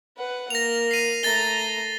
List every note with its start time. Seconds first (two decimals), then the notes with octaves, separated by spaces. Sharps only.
0.17 B4 F#5
0.50 A#3 A#6 F7
0.91 C7 D#7
1.23 A3 A#5 A6 G7